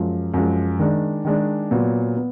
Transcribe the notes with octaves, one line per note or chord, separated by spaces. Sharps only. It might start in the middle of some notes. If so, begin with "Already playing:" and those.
Already playing: F#2 F3 G#3
F#2 F3 G#3
D#3 G#3 D4
D#3 G#3 D4
A#2 F#3 B3
B3